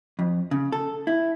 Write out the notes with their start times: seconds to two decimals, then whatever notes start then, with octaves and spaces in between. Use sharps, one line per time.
0.19 F2
0.51 C#3
0.72 A4
1.07 E4